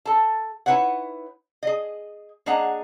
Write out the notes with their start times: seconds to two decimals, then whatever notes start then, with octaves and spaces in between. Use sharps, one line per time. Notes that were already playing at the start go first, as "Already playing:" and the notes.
0.05 A4 A5
0.66 D#4 E4 G#4 B4 C#5 F#5
1.63 G#4 D#5
2.46 A#3 D4 G#4 D#5 F#5 A#5